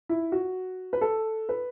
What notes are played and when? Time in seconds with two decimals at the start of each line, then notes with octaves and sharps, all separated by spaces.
0.09 E4
0.32 F#4
0.93 B4
1.01 A4
1.49 B4